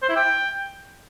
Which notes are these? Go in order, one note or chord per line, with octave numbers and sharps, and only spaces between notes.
C5
E4
G5